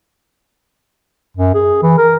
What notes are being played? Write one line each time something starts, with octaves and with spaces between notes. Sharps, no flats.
F#2
G#4
E3
A#4